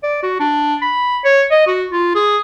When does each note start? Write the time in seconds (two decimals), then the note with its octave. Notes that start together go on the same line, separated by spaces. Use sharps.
0.03 D5
0.23 F#4
0.40 D4
0.82 B5
1.25 C#5
1.51 D#5
1.67 F#4
1.91 F4
2.15 G#4